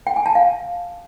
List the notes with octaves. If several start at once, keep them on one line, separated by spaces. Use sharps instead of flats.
G5
G#5
A5
F5